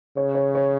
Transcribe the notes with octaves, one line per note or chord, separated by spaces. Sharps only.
C#3 C#5
C#5
C#5